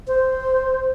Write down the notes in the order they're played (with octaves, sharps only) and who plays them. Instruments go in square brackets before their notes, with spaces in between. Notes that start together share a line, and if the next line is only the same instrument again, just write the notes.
[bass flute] C5